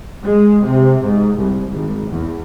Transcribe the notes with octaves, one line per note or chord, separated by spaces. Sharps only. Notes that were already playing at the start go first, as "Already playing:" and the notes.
G#3
C3
G#2
C2
G#1
E2